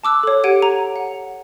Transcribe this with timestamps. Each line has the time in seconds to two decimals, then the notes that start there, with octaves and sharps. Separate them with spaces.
0.04 A5 D6 E6 F#6
0.23 A4 C#5
0.44 G4 C#5 F#5 G#6 D7 D#7
0.62 A#5
0.96 F#5